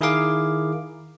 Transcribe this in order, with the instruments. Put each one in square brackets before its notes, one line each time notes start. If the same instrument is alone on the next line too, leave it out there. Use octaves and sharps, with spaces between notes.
[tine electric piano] D#3 E4 G#4 A#4 F5 D6